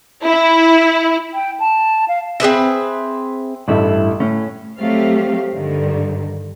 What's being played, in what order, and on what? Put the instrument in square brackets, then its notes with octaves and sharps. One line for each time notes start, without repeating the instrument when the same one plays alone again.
[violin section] E4
[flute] G5
A5
F5
[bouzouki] C4 G#4 B4 E5
[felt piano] A1 A3 [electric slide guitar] G2 E4
[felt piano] A2 [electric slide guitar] C#4
[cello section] F#3 A3 C4 G4 F5
G2 D3 D#3